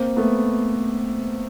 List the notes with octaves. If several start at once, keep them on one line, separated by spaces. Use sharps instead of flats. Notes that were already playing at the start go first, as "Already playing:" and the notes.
Already playing: A#3 C4
A3 B3